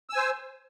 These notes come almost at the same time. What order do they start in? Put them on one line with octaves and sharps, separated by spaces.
E6 G#5 C5